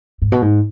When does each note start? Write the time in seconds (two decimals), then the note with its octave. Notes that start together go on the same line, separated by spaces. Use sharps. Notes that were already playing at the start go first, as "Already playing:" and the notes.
0.22 G#2
0.32 B2
0.42 G#2